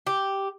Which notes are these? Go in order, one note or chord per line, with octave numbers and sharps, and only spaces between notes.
G4